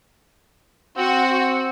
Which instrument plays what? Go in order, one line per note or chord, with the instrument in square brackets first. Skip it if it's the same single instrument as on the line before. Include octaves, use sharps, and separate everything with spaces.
[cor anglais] C4 [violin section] F#4